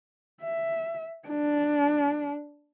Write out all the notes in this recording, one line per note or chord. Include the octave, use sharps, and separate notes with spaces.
E5
D4